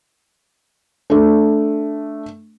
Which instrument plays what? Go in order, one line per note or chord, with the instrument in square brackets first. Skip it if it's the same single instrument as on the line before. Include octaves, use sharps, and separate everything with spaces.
[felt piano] A3 D4